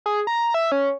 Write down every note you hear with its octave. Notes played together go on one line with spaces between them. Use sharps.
G#4
A#5
E5
C#4